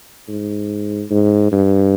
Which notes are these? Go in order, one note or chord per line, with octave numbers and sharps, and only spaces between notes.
G#2
G#2
G2